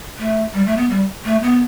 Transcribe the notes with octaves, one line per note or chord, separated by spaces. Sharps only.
A3
G3
A3
B3
G3
A3
B3